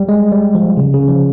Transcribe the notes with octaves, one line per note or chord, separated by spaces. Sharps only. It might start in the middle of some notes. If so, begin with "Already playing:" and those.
Already playing: G3
G#3
G3
F3
C#3
C#3
F3